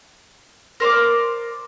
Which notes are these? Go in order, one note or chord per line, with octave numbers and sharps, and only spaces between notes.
A#4 C5 D5 D6